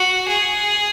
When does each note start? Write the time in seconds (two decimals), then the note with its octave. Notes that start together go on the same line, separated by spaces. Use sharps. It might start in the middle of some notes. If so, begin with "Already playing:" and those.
Already playing: F#4
0.28 G#4